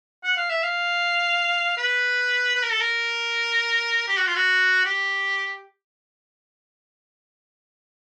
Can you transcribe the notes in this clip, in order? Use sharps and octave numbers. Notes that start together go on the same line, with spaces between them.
F#5
F5
E5
F5
B4
B4
A#4
A4
A#4
G4
F#4
F4
F#4
G4